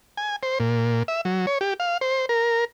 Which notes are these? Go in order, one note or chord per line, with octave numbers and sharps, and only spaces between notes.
G#5
C5
A#2
E5
F#3
C#5
G4
F5
C5
A#4